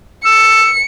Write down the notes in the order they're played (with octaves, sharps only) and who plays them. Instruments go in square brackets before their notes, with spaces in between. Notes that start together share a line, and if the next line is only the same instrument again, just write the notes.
[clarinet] E6 [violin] C#7